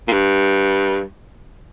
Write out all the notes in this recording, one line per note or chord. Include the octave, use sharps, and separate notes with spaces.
A#2
G2